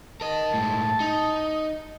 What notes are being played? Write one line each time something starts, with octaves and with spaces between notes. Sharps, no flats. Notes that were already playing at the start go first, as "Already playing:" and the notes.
A#4 D#5 A5
A2 G#3
D#4